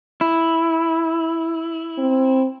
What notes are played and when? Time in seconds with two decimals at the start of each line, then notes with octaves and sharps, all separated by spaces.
0.21 E4
1.98 C4